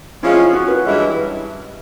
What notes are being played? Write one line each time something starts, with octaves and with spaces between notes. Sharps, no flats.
F3 G#3 C#4 E4
F#4
B4
G2 E3 G#3 C#4 E4